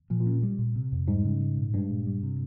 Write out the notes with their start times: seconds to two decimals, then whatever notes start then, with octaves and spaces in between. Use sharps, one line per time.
0.10 A#2 F3
0.21 A#2
0.26 C#4
0.43 G3
0.59 A#2
0.75 C3
0.92 F2
1.08 G#2 G3
1.25 C#3
1.41 G#3
1.57 A#2
1.74 G2 G#3
1.90 A#2
2.07 G3
2.23 C3